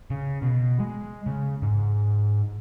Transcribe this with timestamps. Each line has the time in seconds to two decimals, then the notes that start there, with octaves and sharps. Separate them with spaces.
0.10 C#3
0.42 B2
0.80 G#3
1.26 C#3
1.62 G#2